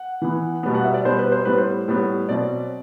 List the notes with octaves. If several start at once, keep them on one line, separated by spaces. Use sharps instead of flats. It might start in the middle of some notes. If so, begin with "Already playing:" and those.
Already playing: F#5
E3 B3
B2 G3 B3
F#5
E5
D5
B2 G3 B3 C5
B4
C5
A2 G3 B3 B4
C5
A2 G3 B3
B2 F#3 C4 D5